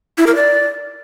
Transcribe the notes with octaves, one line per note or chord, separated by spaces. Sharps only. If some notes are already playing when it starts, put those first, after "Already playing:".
E4
A#4
D5